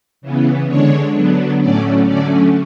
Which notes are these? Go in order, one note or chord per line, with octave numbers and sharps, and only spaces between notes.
C#3 E3 B3
D3 G#3 D4 C#5
D3 F#3 B3 D4
A2 F#3 A3 C#4 D5
D3 F#3 A3 C#4 D5